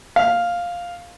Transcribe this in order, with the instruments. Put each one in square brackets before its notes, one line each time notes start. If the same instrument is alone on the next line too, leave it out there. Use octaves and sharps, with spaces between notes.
[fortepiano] F5